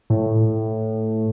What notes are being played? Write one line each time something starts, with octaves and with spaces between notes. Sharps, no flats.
A2